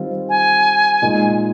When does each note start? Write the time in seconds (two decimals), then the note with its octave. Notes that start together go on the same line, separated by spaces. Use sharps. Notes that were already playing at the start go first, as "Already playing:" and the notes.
Already playing: D#3 G3 C4 F4
0.29 G#5
1.02 A#2 G#3 D#4